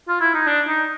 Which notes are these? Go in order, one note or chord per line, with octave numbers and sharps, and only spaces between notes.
F4
E4
D#4
D4
D#4